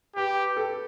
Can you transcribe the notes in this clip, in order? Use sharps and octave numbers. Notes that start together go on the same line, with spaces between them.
G4 B4
A4